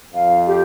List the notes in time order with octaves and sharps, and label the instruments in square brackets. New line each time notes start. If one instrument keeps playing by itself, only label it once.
[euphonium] F2 [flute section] F5
[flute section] G4